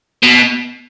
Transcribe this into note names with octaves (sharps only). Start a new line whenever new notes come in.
B2